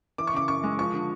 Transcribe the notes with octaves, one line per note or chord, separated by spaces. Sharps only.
E3 D6
C#6
C#3 D6
F#2 C#6
G#3
F3 C#6
D3